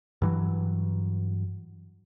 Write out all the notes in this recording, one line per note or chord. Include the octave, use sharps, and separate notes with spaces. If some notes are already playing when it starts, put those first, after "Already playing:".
G2 E3 F#3